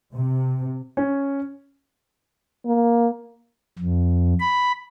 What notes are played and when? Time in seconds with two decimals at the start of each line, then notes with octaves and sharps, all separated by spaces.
0.14 C3
0.97 C#4
2.66 A#3
3.79 F2
4.40 B5